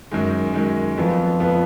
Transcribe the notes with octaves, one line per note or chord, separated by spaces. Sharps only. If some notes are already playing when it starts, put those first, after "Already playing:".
F#2 D#3 G#3
F#2 D#3 G#3
F2 F3 B3 F4
F2 F3 B3 F4